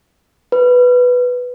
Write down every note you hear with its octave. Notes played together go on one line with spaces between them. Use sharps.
B4